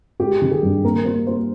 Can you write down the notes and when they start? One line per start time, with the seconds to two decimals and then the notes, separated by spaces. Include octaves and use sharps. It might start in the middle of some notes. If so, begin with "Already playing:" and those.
0.20 G#3 G4
0.42 D#3
0.51 G#4
0.63 G2
0.84 A#3 A#4
1.05 A#3 C5
1.27 A#3 C5